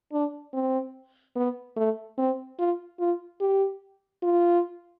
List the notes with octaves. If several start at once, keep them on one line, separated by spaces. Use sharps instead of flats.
D4
C4
B3
A3
C4
F4
F4
G4
F4